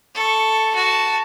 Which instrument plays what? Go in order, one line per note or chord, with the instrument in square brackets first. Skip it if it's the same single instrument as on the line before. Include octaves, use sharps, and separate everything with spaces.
[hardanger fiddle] A4 C#6
F#4 A5